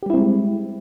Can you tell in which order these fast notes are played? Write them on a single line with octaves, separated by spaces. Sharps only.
G4 G3 E4 C4 G#3